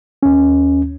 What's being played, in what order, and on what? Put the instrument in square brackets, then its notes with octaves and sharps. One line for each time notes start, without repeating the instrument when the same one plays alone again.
[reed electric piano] D#2 C#4